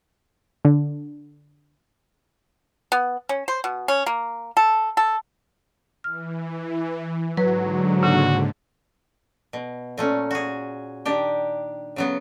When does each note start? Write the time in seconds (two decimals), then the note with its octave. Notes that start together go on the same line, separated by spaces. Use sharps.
0.65 D3
2.92 B3
3.29 C#4
3.48 C5
3.64 B2
3.88 C#4
4.06 A#3
4.57 A4
4.97 A4
6.04 E3 F6
7.37 G#2 D3 F#3 B4
8.03 C#3 A#3 D4 F#4
9.53 B2
9.98 A#2 A3 C#4
10.31 F#4 G#4
11.05 D#3 D4 G4
11.96 C#3 F#3 B3